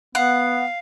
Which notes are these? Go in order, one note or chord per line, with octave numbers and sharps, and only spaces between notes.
B3 F5 F#5